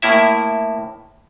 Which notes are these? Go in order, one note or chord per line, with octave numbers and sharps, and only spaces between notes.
A2 A#3 E4 E5